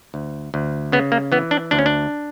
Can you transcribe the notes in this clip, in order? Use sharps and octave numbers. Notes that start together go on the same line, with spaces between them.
D2
D2
C#3 B3
A#3
E3 B3
D4
D2 D4
C#4
D4